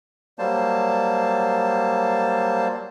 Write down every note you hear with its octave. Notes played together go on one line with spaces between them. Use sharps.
F#3 G3 A#3 C5 A5